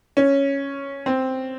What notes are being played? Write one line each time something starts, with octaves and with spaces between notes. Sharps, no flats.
C#4
C4